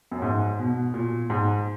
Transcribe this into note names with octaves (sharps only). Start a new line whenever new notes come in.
F#2
G#2
B2
A#2
G#2